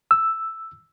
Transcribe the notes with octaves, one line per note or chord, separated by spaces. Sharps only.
E6